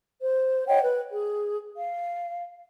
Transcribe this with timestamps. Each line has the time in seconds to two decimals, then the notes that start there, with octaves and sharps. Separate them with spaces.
0.21 C5
0.66 C#5 D#5 F#5 G5
0.81 B4
1.10 G#4
1.77 F5